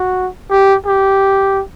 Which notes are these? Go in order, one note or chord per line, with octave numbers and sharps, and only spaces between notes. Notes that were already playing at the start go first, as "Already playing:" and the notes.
Already playing: F#4
G4
G4